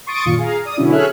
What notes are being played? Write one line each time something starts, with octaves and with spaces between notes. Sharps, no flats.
C6 C#6 D#6 A6 D7
F#2 A#2 D#3 F4 C#6 C#7
G#4 F5 A#5
D5 D#6
B2 D3 F#3 C#4 E4
G#4 A4 C#5 E5 F6 F#6